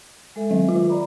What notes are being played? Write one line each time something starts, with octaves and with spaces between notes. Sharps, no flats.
G#3 A4 E5
D#3 F#3
F4
D5 A#5 B5